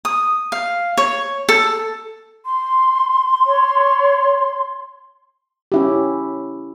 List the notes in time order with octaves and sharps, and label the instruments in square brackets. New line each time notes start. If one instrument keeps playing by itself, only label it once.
[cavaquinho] D#6
F5
C#5
A4
[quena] C6
[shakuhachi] C#5
[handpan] C#4 E4 G4